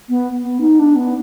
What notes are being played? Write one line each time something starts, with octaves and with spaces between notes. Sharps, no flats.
B3
B3
D#4
D4
B3